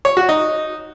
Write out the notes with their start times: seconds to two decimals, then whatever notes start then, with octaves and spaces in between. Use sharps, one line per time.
0.05 C#5
0.17 F#4
0.29 D#4